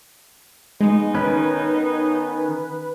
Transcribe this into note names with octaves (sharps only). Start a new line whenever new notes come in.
G#3 B3 D#4
D#3 C#4 B4